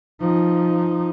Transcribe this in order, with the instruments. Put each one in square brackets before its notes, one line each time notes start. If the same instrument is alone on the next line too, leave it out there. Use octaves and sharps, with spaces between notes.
[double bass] F3 D#4